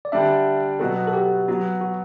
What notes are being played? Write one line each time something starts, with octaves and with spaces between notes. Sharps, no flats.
D5
D3 G3 D4 E5
B2 F#3 B3 F#4 A4
A4
G4
F#3 B3 F#4
F#4